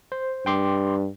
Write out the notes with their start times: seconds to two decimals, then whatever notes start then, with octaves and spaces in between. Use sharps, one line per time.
0.12 C5
0.46 G2 G5 C6 D6